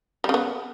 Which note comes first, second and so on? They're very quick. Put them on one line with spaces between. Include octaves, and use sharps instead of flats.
G3 C#3 B3